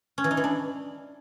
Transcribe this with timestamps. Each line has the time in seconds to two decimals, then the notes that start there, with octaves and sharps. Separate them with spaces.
0.18 C#4
0.24 E3
0.31 D#4
0.37 E3
0.44 D4